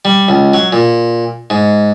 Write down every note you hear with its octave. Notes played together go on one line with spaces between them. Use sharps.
G3
C#2
F#3
A#2
G#2